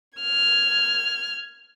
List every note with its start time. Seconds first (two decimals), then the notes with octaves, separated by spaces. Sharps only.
0.19 F6 G#6